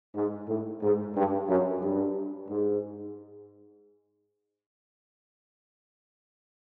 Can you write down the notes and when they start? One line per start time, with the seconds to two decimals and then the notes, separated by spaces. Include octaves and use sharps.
0.15 G#2
0.49 A2
0.82 G#2
1.15 G2
1.49 F#2
1.82 G2
2.49 G#2